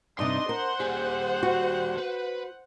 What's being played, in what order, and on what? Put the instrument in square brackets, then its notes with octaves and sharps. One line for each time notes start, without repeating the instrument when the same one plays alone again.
[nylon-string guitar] G2 C3 [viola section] D4 D#4 D#5 [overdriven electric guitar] C6
[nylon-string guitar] A#4 [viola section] C5 F#5
[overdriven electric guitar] D#2 G3 [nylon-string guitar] G#4
[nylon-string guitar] F#4
[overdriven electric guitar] B4